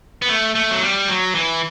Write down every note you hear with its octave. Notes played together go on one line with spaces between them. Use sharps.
B3
A3
A3
F#3
G3
F#3
E3